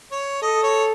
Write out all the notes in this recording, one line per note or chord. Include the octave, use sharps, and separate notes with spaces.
C#5
A4 D#5
C#5